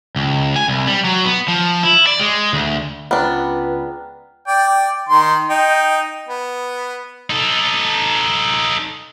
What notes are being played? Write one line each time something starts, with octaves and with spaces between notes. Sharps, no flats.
C#2
G#5
C2
G3
F#3
B3
F3
E4
D5
G#3
D2
C#2 B3 D4 B4 G5 A#5 F6
D5 G5
D#3 C6
D#4 G5
B3
D#4 A4